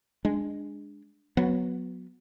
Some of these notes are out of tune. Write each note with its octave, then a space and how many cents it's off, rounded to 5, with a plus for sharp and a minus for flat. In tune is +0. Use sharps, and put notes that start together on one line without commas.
G#3 -10 D4 +0
F#3 -15 B3 +0